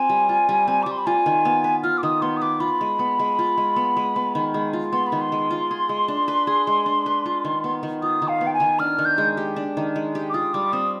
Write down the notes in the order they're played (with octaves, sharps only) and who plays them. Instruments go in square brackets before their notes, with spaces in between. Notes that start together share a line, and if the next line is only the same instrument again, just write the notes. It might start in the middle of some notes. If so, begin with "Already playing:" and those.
Already playing: [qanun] C4 F4 [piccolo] G#5
[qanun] G3
F4
G3
C4
[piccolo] D6
[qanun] G3 [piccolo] C6
[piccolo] B5
[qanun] F4 [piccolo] G#5
[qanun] D#3
B3
B4
[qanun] F4 [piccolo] F6
[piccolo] D6
[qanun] D#3 [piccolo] D#6
[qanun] B3 [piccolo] C6
[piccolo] D#6
[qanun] B4 [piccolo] D6
[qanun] F4 [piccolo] B5
[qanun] G#3
B3
G#3
F4
G#3
B3
G#3
B3
D#3
G#3
F4
[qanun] B3 [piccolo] C6
[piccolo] B5
[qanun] D#3
[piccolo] C6
[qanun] G#3
F4
G#4
G#3
D4
B4
G#4
G#3
D4
B4
F4
D#3
B3
D#3
[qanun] F4 [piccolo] D#6
[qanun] D#3
[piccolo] F5
[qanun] B3
[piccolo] G5
G#5
[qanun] D#3
[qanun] D4 [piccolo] F6
[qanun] D#3
[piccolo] G6
[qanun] G#3
G4
D4
D#3
G#3
G4
[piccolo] D6
[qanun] F4 [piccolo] D#6
[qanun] G3 [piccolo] D6
[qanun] C4 [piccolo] D#6